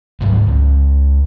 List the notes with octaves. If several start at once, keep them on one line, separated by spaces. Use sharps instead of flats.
D2 G#2 F#3
C#2